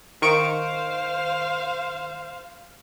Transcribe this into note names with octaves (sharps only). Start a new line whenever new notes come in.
D#3 C5 F5 C#6 D7